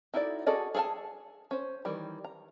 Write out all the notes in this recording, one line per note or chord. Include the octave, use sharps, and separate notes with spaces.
D#4 E4 F#4 A4 D5
F#4 G#4 A4 D5 D#5
G#4 A4 B4 G#5 A5
C#4 C5
D#3 E3 G3 B5
A#5